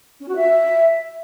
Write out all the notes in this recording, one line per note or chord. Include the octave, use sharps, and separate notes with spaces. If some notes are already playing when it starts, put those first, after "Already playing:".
C#4
F#4
E5